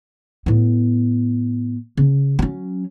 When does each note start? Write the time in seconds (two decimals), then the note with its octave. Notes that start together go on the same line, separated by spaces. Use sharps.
0.46 A2 B3
1.97 C#3
2.39 F#3 C#4